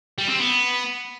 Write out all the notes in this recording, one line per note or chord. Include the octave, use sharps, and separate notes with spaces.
G3
C4
B3